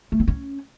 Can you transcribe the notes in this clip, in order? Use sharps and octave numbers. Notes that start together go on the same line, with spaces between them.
A3
C4
C#4